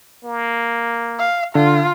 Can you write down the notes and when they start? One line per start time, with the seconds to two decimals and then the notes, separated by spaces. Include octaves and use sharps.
0.25 A#3
1.19 F5
1.55 D3 F4